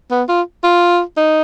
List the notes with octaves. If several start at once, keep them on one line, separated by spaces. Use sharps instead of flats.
B3
F4
F4
D#4